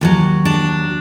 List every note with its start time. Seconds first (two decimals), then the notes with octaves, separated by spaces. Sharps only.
0.01 D#2 D#3 F#3
0.45 D4